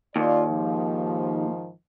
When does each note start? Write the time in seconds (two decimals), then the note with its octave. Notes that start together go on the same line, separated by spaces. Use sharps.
0.16 D#2 F4 D5
0.49 G#2 D#3 F3